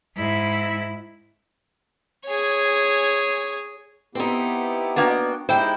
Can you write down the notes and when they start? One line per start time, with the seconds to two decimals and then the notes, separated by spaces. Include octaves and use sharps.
0.17 G#2 E4
2.26 G#4 C#5
4.15 B3 C4 D#4 E4 G4
4.96 A#3 B3 D4 F#4 G5
5.49 G#3 D#4 E4 G4 C5 G5